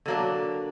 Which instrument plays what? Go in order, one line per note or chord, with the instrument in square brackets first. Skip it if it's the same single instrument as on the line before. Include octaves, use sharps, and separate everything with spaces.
[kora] D3 F#3 A#3 D4